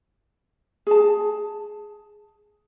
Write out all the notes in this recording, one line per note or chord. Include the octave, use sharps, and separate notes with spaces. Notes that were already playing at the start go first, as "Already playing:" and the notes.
G#4 A5